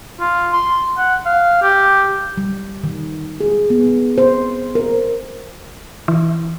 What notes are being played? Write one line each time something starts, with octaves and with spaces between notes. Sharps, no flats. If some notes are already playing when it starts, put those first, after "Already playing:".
F4
C6
F#5
F5
G4
G3
D#3
G#4
B3
C5
A#4
E3